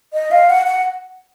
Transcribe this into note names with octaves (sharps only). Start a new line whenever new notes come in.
D#5
F5
F#5
F#5